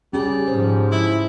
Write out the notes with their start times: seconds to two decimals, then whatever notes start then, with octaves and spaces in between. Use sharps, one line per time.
0.13 G3 C#4 G#4
0.48 G#2 F3 C5
0.92 E4